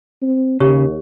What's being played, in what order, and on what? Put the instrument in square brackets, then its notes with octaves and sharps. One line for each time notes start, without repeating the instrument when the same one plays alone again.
[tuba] C4
[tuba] D#2 [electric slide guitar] C#3 [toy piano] G4 C#5